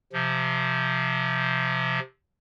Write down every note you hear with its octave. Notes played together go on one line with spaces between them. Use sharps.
C3 F3